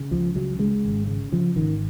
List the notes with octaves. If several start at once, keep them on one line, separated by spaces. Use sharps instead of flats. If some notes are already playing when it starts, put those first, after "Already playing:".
Already playing: C#3
C#2 F3
C#3 F#3
C#3 G#3
G#1
C#3
C#3 F3
G#1 D#3